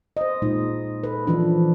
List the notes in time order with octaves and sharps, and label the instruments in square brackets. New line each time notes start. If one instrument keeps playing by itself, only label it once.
[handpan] C5 D#5
A#2 G#3 D#4
A4 B4
E3 F3 D4